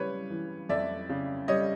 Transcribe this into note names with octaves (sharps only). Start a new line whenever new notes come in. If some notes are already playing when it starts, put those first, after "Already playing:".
Already playing: C#3 G3 B4 C#5
E3
F2 D5 E5
C#3
G3 C#5 D#5